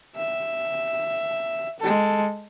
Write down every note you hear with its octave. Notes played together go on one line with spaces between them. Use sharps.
E5
G#3 A4